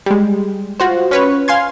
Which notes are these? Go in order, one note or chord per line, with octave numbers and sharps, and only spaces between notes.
G3 G#3
F4 F#4 C5
C#4 B4 C#5
F5 G#5 C6 G#6